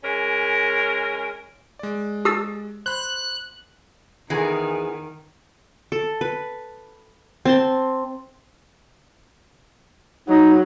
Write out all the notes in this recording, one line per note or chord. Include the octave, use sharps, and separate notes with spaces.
G#3 C#4 A#4
G#3 D5
G4 D#6 E6 A6
C5 B5 F#6
E2 D#3 E3 G#4
A4
B4
C4 A5 C6
F#3 D#4